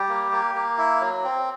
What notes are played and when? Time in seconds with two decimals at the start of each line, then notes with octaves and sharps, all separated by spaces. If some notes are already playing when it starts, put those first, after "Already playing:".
Already playing: G3 G4
0.09 A#3
0.32 A#3
0.55 A#3
0.78 E4
1.01 F#3
1.24 C4